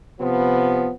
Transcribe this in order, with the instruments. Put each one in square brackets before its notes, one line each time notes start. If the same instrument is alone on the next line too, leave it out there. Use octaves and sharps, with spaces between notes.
[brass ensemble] C3 F3 B3